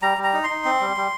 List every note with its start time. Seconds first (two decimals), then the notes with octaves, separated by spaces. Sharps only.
0.02 G3 A#5
0.18 G3
0.24 A#5
0.33 D#4
0.44 C6
0.50 D#4
0.65 C4
0.80 G3
0.97 G3